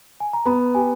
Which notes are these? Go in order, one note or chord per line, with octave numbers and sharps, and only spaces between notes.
G#5
A#5
B3 B5
G4 G#5